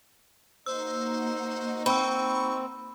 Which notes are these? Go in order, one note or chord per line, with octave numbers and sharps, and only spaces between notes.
A#3 D#4 F#4 C5 E6
C4 B5 C#6 E6